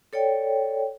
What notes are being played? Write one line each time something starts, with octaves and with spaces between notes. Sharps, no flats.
A4 C#5 D5 G5